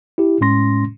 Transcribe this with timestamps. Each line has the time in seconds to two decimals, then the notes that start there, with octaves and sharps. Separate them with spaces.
0.18 E4 G4
0.41 A2 G#3 C#4 C6 A#6